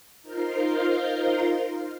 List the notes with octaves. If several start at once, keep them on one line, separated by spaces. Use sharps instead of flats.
D#4 F4 A#4 C5 F5 C6